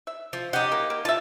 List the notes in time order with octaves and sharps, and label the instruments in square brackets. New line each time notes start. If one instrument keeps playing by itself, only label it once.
[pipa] E5
[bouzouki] F3
[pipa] C#4 F#5 [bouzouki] D#4 G4
[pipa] A#3
A#3
[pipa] F4 E5 [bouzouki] A5